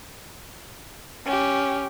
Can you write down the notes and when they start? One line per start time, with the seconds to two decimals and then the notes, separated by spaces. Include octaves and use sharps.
1.26 C#4 G4